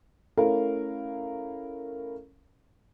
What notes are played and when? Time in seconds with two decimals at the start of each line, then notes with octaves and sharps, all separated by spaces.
0.38 A3 C#4 E4 A#4 F5